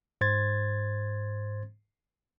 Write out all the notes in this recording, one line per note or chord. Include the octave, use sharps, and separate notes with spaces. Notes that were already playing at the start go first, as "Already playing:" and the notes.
G#2 C5 C6 G#6 A6